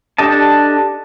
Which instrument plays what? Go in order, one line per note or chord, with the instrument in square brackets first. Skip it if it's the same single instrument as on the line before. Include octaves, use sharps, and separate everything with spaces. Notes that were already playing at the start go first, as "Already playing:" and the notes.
[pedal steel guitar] D4 G4 A4 D#5 A5